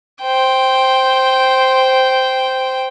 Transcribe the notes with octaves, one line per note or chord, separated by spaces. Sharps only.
C5 G5